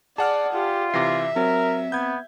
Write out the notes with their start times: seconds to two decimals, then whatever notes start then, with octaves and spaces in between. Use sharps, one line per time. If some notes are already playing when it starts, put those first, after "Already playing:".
0.18 G#4 D5 F#5 A5 F6
0.54 F4 G4
0.94 C3 E3 E5 D6 A#6 C7
1.36 F#3 C4 A#4
1.92 B3 G6 G#6